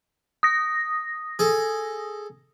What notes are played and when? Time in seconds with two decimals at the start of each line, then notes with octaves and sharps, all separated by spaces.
0.43 D#6 A#6
1.39 G#4 A4